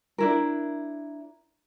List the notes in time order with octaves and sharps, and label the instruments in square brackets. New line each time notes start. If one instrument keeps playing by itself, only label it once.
[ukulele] D4 E4 A#4